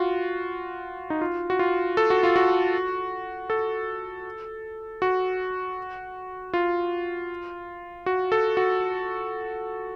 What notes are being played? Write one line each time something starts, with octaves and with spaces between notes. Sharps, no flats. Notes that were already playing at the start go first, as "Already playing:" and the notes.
Already playing: F4 F#4
D#4
F4
F#4
F4
A4
F#4
F4
F#4
A4
F#4
F4
F#4
A4
F#4